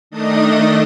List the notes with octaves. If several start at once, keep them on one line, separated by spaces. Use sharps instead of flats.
D#3 A3 D4 D#4 D#5 D#6